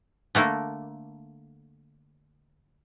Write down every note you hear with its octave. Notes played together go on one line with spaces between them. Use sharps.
D3 A3 A#3